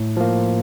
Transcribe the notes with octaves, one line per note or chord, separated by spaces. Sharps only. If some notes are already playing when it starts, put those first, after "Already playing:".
Already playing: A2
F3 A#3